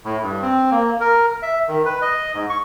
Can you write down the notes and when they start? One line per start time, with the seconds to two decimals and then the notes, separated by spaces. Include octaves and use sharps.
0.05 A2
0.22 G2
0.42 C4
0.71 A#3
1.00 A#4
1.42 E5
1.68 D#3
1.85 B4
2.02 D#5
2.33 G#2
2.49 C#6